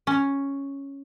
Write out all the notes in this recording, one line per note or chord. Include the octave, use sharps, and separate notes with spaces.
C#4